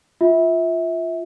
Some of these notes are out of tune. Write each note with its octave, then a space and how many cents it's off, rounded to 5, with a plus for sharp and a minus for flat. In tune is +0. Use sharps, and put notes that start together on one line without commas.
F4 +0 E5 -25